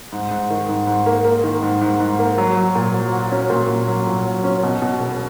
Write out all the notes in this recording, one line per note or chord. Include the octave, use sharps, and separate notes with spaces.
G#2
G#2
D#3
G#2
G#2
A#3
A#3
D#3
G#2
G#2
G#2
A#3
F#3
F#3
A#2
F#3
F#4
C#4
A#2
A#2
F#3
A#2
F#3
C#4
B2
B2
E1